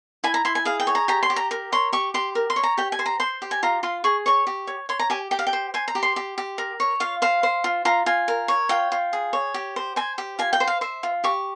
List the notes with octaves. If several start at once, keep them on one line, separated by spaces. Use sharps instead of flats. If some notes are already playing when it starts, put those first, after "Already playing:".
E4 G#5
A#5
E4 C6
G#5
G#4 F5
G5
C#5
A#5
G4 A#5
C6
G4
A#5
A#4
C#5 C6
G4 C#6
G4 C6
A#4
C6
C#5
A#5
G4 G5
G#5
C5
A#5
C5 C6
G4
G#5
F4 A#5
F4 C6
G#4 C#6
C#5 C#6
G4
C#5
C#5 C6
A#5
G4 G#5
G4 G5
F5
G5
C5
C5 G#5
A#5
G4
C6
G4
G4
A#4
C#5
F4 F5
C5 F5
C5
F4
F4 A#5
F4 G#5
A#4
C#5
F4 G5
F4
G#4
C#5
G4
C5
C5 G#5
G4
F4 G#5
G5
C5
F5
C5 E5
F4
G4 C#6